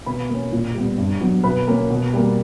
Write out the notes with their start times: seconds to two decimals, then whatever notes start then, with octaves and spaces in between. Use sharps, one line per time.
0.06 B2 B4 B5
0.29 A#3 C#4
0.52 A#2
0.75 G3 B3
0.98 G2
1.21 F#3 B3
1.43 B2 B4 B5
1.67 A#3 C#4
1.90 B2
2.13 G3 A#3